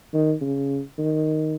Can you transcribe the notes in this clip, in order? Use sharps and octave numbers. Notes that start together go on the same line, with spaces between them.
D#3
C#3
D#3